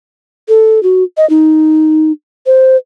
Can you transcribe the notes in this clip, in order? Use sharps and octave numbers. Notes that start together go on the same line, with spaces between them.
A4
F#4
D#5
D#4
C5